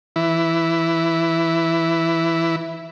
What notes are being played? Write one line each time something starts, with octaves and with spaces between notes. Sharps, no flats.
E3 E4